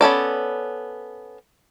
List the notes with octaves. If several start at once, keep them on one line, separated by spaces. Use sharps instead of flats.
B3 C#4 A4 D5